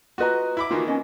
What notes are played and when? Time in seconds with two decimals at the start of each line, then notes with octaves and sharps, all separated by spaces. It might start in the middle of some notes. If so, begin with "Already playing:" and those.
0.18 F4 F#4 B4 D#5 A#5
0.57 E4 B5 D6
0.71 D#3 E3 A#3 F4 F#4
0.88 C#4 D#5